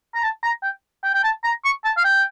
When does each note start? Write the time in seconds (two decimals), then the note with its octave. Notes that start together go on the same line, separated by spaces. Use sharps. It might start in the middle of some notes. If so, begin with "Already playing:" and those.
0.15 A#5
0.23 A5
0.43 A#5
0.63 G5
1.03 G5
1.14 G5
1.24 A5
1.44 A#5
1.65 C#6
1.84 A5
1.97 F5
2.04 G5